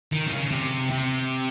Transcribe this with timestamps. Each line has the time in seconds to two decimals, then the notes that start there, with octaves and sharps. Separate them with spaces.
0.12 D#3
0.27 C3
0.32 C#3
0.51 C3
0.90 C3